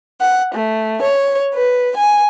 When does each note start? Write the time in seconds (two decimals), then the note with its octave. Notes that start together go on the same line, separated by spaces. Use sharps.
0.21 F#5
0.54 A3
1.01 C#5
1.54 B4
1.96 G#5